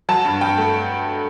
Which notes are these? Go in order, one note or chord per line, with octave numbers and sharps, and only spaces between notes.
F#3 A5
G2
G2 G5
A3